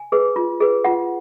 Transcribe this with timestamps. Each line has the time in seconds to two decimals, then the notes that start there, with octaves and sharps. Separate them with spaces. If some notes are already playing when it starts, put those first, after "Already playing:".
Already playing: G#5
0.12 G#4 B4
0.36 F4
0.60 G#4 B4
0.84 F4 F#5